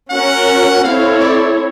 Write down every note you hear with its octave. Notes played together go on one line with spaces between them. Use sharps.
C#4 F#4 A#4 F#5
C4 E4 A4 C#5 F5
D5